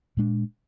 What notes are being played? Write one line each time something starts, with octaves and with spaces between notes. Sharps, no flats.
A#2 G#3 D4